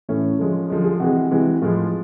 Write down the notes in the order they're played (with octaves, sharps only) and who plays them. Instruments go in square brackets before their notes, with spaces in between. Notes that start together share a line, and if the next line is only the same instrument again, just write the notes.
[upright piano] A2 E3 A3 C#4
D3 F3 G#3
D3 F3 G#3
G#4
C3 E3 G#3 F#4
C3 E3 G#3
A2 F3 G#3 F4